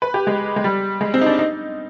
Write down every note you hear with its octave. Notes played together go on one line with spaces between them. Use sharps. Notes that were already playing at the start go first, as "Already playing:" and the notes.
B4
G4
G#3
G#3
G3
G#3
C4
D#4
D4
D#4